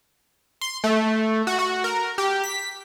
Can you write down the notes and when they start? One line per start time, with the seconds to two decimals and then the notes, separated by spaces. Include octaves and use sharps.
0.61 C6
0.84 A3
1.47 F#4
1.59 F#4
1.84 A#4
2.18 G4
2.44 B6